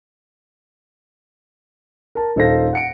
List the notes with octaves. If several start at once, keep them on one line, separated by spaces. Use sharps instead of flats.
A#4 A5
D#1 D#4 A4 C5 F5 A#6
F#5 C#7 D7